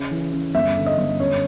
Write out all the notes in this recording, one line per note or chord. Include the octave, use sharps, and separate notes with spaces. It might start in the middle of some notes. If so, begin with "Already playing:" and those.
Already playing: C#3
E3
C#3
G1 E5
D3
D#5
G1
F#2 C#5